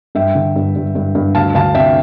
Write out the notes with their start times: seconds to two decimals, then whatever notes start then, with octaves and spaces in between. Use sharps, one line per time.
0.15 G2 E5 G5
0.35 D3
0.56 G2
0.76 G2
0.95 G2
1.15 G2
1.35 D2 F5 A5
1.55 D2 F5 A5
1.75 C3 E5 G5